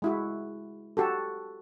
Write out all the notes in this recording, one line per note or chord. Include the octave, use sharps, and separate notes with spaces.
G#3 E4 F#4
F#4 G4 A4